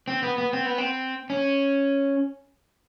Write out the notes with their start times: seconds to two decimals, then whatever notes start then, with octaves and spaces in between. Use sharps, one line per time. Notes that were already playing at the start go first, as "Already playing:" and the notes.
0.08 C4
0.23 B3
0.38 B3
0.53 C4
0.66 B3
0.78 C4
1.30 C#4